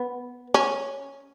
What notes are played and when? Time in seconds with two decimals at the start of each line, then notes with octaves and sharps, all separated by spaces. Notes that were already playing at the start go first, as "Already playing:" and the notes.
Already playing: B3
0.54 C#4